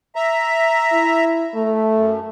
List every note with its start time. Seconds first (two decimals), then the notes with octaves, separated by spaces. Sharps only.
0.16 E5 A#5
0.92 E4
1.55 A3
1.95 F#2